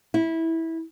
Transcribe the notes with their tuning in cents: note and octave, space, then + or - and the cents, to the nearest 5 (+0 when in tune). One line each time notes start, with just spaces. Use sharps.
E4 -15